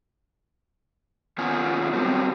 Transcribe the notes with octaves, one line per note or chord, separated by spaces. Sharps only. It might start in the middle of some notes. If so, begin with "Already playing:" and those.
D#3 B3 C#4 F4 G#5
F#3 G3 C4